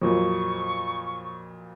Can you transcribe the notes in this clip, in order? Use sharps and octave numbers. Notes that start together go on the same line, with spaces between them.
F2 A#2 F#3 C#6